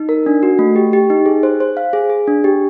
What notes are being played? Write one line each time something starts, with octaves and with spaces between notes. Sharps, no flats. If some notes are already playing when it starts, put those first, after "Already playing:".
Already playing: D#4
A#4
D4
F#4
A3
G4
G4
D#4
G#4
C5
C5
F5
G#4
G#4
D4
G4